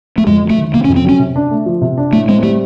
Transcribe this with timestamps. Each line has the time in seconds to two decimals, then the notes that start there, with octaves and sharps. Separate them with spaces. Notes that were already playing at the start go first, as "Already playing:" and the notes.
0.18 A3
0.27 F2 G#3
0.42 F#3
0.50 A3
0.58 D#3
0.73 C3 A#3
0.84 C#4
0.89 F2
0.96 C4
1.04 F#3 C#4
1.19 C3
1.36 D4
1.51 A3
1.66 F3
1.81 C3
1.98 D4
2.13 A2 A3
2.29 G#3 C4
2.43 G3 A3